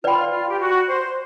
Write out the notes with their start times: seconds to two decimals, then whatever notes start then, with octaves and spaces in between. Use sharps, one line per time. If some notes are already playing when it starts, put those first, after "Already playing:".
0.04 F4 B4 D5 G5 B5
0.32 F4
0.49 G4
0.60 F#4
0.88 C5